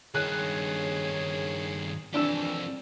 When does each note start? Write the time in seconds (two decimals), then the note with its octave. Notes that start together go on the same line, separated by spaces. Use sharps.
0.15 G2 D#3 G#4 C#5 F#6
2.14 F2 D#3 E3 D4 G4 E6 E7